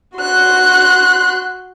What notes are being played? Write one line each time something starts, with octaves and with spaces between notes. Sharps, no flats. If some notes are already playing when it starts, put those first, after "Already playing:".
F#4 C6 F#6